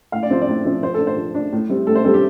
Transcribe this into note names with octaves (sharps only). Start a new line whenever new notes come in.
A2 F5
D5
F3 C4 C5
D5
A2
F3 C4
F3 C5
A4
D4
C5
F3
D4
A2
G3 C4
A2 A4
C5
G3 C4 A4
G4